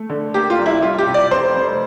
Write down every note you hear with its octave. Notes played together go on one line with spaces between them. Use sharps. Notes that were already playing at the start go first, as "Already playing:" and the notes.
Already playing: A3
D3
A#3 G4
F4
C2
E4
G3 F4
G4
C3
D5
F1 C5
F1